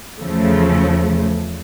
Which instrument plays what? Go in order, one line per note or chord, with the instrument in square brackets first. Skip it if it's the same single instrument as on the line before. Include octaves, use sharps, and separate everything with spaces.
[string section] E2 C#3 F3 A3